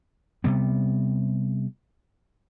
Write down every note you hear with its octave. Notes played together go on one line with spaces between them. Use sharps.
C3 G3 B3